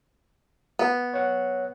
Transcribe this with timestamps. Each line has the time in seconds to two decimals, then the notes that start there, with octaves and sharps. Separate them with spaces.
0.79 B3
1.14 C#5 F#5